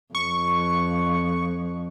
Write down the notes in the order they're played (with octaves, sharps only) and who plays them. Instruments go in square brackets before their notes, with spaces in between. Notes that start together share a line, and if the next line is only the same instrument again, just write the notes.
[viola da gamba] F2 [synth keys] C#6